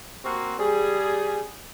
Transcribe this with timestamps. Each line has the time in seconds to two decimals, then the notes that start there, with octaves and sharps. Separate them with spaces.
0.25 A#3 C4 F#4
0.59 G3 G#4